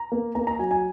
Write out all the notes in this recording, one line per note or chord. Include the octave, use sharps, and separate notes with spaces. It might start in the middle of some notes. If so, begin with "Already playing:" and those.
Already playing: A#5
A#3
A#3 A#5
A#5
F#3 G#5
G#5